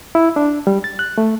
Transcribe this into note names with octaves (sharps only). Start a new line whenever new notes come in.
E4
D4
G3
A6
F#6
A3